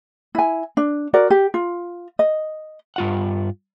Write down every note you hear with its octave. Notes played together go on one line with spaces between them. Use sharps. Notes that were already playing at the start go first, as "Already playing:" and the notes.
E4 G#5
D4
F#4 A#4 D5
G4
F4
D#5
G2 F4 F#5